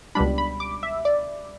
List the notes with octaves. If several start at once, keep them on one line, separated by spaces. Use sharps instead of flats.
C#2 B2 G3 D4 B5
B5
D6
E5
D5